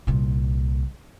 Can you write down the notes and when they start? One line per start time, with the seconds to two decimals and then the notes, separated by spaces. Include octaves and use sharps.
0.07 C2 A#2